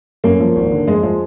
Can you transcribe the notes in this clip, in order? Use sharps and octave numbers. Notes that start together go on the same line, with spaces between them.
F#2 A#3
F3
G#1
D3
F2 G#3
F3 G#3